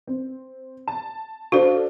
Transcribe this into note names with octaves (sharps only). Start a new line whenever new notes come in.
C4
A5
D4 F#4 A4 C5 F5